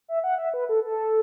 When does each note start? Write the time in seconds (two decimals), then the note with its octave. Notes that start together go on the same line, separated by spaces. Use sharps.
0.08 E5
0.24 F#5
0.38 E5
0.54 B4
0.69 A4
0.84 A4